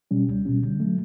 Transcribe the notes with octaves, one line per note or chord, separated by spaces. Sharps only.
B2 G3 C#4
C#2
B2 G3 C#4
D3
F#3 A3